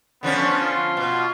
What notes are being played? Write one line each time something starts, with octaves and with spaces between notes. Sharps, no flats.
D3 F3 B3 C#4
F4
B2